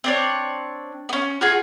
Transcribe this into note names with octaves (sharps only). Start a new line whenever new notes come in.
C4 D4 C#5
B3 C#4
F4 F#4 G#4